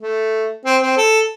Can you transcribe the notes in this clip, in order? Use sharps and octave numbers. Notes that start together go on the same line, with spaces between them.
A3
C4
C4
A4